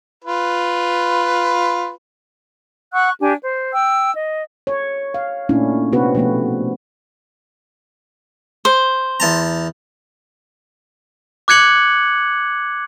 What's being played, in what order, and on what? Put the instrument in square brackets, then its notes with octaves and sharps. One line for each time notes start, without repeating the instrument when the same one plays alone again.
[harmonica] F4 B4
[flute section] F#5 C#6 E6 F#6
D4 G4 G#5
C5
G5 E6
D#5
[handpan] C#5
F5
A#2 A3 C#4 D4 E4
C3 B3 C4 D4 F#4 B4
B2 F3 A3 B3
[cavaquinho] C5
[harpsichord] E2 A5 A#5
[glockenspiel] D6 F#6 G#6 C#7 F#7